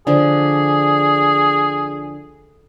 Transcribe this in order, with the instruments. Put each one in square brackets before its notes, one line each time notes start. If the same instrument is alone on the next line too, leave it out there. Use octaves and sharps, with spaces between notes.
[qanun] D3 F3 D4 [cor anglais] G#4